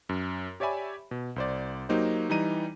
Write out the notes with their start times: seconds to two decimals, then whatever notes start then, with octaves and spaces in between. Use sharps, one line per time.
0.09 F#2
0.60 G4 C#5 D5 E5 G#5 B5
1.11 B2
1.36 C2 C5 D5
1.89 F#3 A#3 D#4 G4 C5
2.30 E3 G3 D#4 A#5 D#7